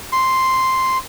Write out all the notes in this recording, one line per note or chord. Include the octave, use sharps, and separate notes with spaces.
C6